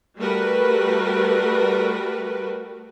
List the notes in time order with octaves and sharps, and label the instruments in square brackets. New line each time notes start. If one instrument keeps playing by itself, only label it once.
[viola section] G3 A3 F#4 A#4 B4